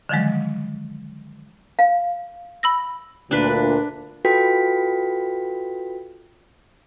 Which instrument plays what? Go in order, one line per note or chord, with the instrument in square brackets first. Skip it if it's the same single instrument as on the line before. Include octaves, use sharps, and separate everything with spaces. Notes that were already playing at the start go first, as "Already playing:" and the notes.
[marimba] D3 D#3 F3 F#3 G#3
[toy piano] F5
[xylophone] B5 E6 A#6
[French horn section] D2 A#2 [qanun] D4 B4
[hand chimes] F4 F#4 A4 B4 G5 B6